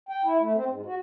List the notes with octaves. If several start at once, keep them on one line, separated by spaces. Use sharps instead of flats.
G5
E4
A3
C4
G#2
F#4